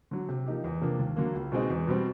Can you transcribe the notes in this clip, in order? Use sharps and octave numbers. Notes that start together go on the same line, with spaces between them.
D3 F#3
C3
F3 A#3 D#4 G4
E2
C3 F3 A#3 D4
D#2
D3 F#3 A#3
C#2
B2 G#3 C4 D#4
E2
B2 G3 C4